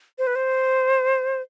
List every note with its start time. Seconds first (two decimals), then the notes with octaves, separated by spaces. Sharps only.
0.18 C5
0.27 B4
0.36 C5